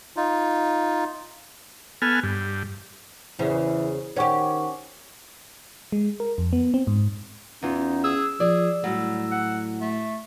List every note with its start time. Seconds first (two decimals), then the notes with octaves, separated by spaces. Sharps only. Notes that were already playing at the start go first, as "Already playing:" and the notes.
0.16 D#4 F4
2.02 B3 A4 G#5 F6
2.23 G2
3.39 E2 C#3 E3 C5
4.16 D#3 C#4 G4 C5 F#5 C#6
5.92 G#3
6.20 A#4
6.38 F2
6.53 B3
6.74 C4
6.87 G#2
7.63 E2 B3 C#4 D#4 F4
8.04 G#4 E6
8.40 F3 G#4 D5
8.84 A2 F#3 G3
9.31 F#5
9.81 A3